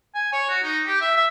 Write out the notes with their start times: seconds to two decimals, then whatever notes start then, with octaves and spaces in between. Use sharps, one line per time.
0.15 G#5
0.32 C#5
0.49 F#4
0.63 D#4
0.86 G4
1.01 E5
1.17 E5